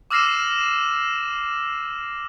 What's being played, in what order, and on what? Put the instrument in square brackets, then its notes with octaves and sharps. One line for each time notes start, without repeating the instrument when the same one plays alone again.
[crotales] D6 E6 F6 A#6 C7 E7